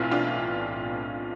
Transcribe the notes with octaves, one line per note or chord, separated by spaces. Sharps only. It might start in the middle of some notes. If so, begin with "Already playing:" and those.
Already playing: B1 A2 E3 C4 E4 F4
D4 F4